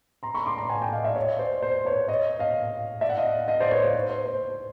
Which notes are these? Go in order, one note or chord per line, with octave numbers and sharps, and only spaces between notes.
A#5 C6
B5 C#6
C6 D6
A#5 C6
F#5 G#5
G5 A5
D#5 F5
D5 E5
C#5 D#5
C5 D5
C5
B4 C#5
C#5 D#5
D#5 F5
D5 E5
F#5
D#5 F5
D#5 F5
C5 D5
B4 C#5
C5
C5
C5
C5